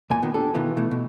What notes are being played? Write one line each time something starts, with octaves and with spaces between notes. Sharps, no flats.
E2 A#2 G#5
A#2 D#3 B3
D4 G4 A4
B2 D#3 E3 B3 F4
B2 E3 A3
B2